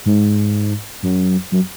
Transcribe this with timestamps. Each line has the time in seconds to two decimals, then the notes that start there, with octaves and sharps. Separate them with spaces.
0.06 G#2
1.03 F#2
1.51 F#2